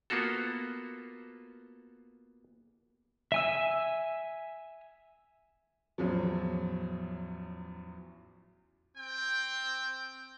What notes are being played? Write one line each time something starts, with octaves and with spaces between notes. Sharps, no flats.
A#3 B3 F4 F#4 A4
E5 G#5 E6
A1 E2 F3 F#3
C4 G5